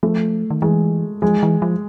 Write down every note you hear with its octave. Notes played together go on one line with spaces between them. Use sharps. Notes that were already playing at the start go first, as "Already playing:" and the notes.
F3 A3
D#3
E3 G#3
F3 G#3
E3
F3